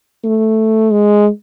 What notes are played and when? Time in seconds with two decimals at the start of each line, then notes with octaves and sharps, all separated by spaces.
0.24 A3
0.93 G#3